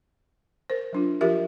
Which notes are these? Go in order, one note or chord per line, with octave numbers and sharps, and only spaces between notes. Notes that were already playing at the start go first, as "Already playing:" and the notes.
A#4 C5
F#3 D4 F4
F3 F4 G4 A#4 E5